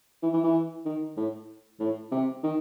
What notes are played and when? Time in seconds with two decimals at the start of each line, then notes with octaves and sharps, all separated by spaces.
0.23 E3
0.33 E3
0.44 E3
0.86 D#3
1.17 A2
1.80 A2
2.12 C3
2.43 D#3